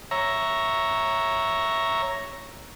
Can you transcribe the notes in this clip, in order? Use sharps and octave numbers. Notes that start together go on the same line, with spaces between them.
C#5 E5 A#5